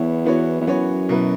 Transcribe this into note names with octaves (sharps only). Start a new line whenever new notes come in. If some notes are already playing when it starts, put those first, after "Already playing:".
Already playing: E2 B3 E4 C#5
E3 B3 F#4 C#5
E2
F#2 E3 B3 F#4 C#5
B2 F#3 E4 B4